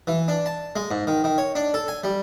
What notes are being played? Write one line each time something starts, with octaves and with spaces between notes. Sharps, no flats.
E3
D4
A5
G#3
G#2
D#3
D#3
C#5
D4
A4
G#5
G3